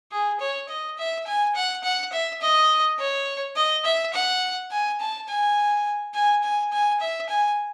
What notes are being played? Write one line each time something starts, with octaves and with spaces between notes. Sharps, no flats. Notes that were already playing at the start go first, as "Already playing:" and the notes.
G#4
C#5
D#5
E5
G#5
F#5
F#5
E5
D#5
C#5
D#5
E5
F#5
G#5
A5
G#5
G#5
G#5
G#5
E5
G#5